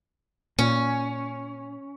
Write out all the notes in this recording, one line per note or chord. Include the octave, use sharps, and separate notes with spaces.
A#2 C#4